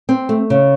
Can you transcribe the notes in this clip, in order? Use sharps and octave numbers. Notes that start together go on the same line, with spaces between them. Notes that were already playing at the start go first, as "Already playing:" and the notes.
C4
A3
C#3